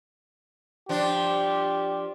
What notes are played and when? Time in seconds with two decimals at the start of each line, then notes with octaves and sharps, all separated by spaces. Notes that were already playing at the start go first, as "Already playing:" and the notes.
0.89 F3 D4 G4